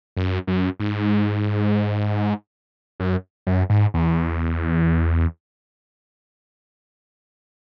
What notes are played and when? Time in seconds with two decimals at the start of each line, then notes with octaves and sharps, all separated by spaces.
0.17 F#2
0.47 F#2
0.80 G#2
3.00 F#2
3.47 F#2
3.70 G#2
3.94 E2